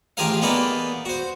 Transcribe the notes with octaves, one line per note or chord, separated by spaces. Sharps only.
A1 F4 G4 G#4 A#4 F5
A#3 B3 D#4 G#4 B4 D5
F#4 C5